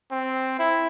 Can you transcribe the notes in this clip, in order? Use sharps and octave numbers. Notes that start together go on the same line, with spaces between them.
C4
E4